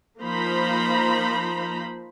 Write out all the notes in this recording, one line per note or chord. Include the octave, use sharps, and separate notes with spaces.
F3 A#3 D#4 C5 A#5 B5